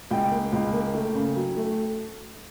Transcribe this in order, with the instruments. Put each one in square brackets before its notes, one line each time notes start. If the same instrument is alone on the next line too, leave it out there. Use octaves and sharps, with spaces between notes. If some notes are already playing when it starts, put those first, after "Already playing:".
[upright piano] C#2 G5
A#3
C#2
A#3
A3
C#3
F#3
A3